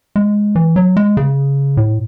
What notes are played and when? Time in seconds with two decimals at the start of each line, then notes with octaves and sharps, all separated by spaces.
0.16 G#3
0.56 E3
0.76 F#3
0.97 G#3
1.17 C#3
1.77 A2